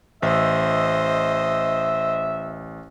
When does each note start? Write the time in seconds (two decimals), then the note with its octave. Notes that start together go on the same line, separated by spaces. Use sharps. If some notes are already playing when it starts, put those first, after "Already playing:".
0.22 A1 C5 D#5 E5